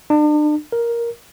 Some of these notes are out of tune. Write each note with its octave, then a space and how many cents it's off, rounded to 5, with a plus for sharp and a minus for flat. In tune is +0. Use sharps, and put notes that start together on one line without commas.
D4 +40
A#4 +5